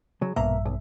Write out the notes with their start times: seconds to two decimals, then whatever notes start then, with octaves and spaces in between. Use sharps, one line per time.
0.21 C#3 F#3
0.36 A#1 G2 B2 A#3 E5 A#5
0.65 B1